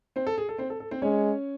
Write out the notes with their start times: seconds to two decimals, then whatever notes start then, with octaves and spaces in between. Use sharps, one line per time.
0.16 C4 C5
0.27 A4
0.38 G#4
0.49 A4
0.58 C4 C5
0.70 A4
0.80 A4
0.91 C4 C5
1.02 G#3 C#4 C#5